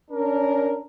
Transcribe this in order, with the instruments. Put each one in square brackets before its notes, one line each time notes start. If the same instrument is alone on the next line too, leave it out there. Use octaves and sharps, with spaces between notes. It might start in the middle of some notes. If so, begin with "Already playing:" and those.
[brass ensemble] C#4 D4 A#4